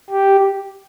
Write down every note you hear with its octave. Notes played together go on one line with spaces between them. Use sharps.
G4